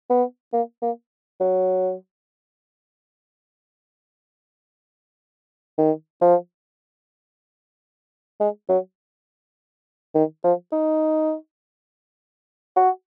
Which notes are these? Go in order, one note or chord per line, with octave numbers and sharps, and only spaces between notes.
B3
A#3
A#3
F#3
D#3
F3
G#3
F#3
D#3
F3
D#4
F#4